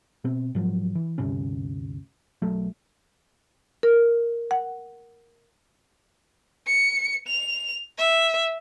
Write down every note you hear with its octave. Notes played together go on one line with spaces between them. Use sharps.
B2 C4
G#2 F3 F#3
E3
D2 G2 C3 C#4
B1 F#3 A3
A#4
F#5
C#7
F7
E5